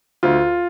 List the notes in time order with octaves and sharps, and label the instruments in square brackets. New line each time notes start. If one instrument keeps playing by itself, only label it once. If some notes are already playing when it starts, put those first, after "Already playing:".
[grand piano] D2 F4